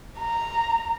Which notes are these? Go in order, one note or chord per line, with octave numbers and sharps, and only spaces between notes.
A#5